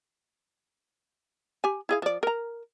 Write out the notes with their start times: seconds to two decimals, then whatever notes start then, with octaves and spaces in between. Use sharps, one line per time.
1.64 G4 G#5
1.89 E4 G#4 F5
2.02 F3 D5
2.23 A#4 A#5